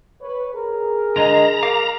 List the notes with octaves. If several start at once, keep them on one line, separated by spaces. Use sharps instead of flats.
B4 C#5
G#4 A#4
D3 G#3 D#5 A#5
A#4 F5 D6